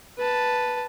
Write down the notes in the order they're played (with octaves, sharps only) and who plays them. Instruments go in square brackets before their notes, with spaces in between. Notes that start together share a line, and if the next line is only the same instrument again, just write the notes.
[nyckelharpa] B4 A5